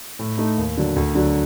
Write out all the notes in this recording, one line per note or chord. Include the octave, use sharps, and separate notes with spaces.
A2
A3 D#4
D#2
D3 F#3
D2
D3 F#3